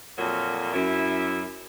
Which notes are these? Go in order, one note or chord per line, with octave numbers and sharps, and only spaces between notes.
F2 A#2 F#3
F#2 E4